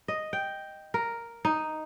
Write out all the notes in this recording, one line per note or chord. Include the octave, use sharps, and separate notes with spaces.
D#5
G5
A#4
D#4